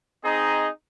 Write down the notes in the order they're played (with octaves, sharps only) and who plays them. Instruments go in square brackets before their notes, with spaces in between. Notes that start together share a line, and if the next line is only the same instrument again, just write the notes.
[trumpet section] C4 D#4 G#4 D#5 A#5